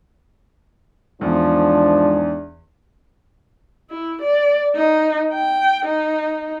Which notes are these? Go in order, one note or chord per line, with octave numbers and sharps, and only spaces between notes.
E2 G#2 F3 D4
E4
D5
D#4
G5
D#4